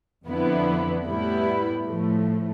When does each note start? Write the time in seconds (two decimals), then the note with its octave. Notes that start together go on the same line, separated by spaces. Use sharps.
0.27 F2 D3 F3 B3 E4
1.06 A2 G3 B3 E4
1.86 A2 F3 A3